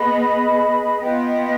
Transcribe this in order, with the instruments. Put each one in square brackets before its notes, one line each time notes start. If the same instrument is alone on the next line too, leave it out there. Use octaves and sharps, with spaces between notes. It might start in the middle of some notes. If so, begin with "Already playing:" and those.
Already playing: [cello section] B3 [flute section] G#4 B4 D#5 B5
[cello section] B3 [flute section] F4 B4 D#5 G5